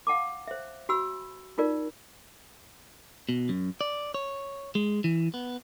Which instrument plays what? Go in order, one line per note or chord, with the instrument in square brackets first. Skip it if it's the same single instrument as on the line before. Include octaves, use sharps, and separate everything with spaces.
[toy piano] F5 F#5 A5 D6
C5 E5
F#4 G#5 B5 E6
D#4 F4 A#4 D5
[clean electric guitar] B2
F#2
D5
C#5
G#3
E3
B3